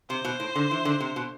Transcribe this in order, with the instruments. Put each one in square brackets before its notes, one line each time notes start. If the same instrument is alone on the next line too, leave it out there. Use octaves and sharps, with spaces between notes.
[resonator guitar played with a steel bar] C3 [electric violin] C5
[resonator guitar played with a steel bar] B2
A2
D3
E3
D3
C3
B2